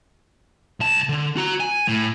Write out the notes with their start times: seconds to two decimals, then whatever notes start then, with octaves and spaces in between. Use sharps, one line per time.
0.80 C2 A5
1.09 D3
1.37 F#4 A#5
1.60 G#5
1.88 A2